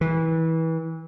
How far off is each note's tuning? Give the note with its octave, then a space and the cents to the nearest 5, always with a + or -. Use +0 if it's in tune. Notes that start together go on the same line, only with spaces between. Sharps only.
E3 -25